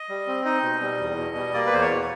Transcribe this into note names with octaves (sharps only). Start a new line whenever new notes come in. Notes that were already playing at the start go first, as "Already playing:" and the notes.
Already playing: D#5
G3
C4
D#4 D#5
B2
G3
E2
B2
G3
A#3 D5
B4
E2 C5
C#5
B2